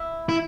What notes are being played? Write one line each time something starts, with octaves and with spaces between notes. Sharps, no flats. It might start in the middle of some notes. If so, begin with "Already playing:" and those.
Already playing: E4
E4